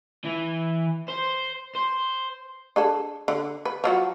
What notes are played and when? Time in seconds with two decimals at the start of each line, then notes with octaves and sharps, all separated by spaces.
0.25 E3
1.09 C5
1.75 C5
2.76 D4 G#4 A4
3.28 D3
3.65 B4
3.84 F3 F#3 F#4